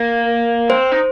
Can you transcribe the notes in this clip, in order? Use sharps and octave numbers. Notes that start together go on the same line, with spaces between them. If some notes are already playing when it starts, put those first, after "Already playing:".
Already playing: A#3
C4 C5
D#4